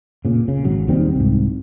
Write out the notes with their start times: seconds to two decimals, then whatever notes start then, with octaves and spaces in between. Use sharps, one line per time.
0.25 A#2 C#3
0.48 C#3
0.64 G#1 C#3 F#3
0.87 D#2 D#3 G3 C4
1.16 C2 G#2